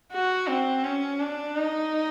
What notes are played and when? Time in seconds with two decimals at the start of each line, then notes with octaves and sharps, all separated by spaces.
0.12 F#4
0.48 C4
0.84 C#4
1.20 D4
1.56 D#4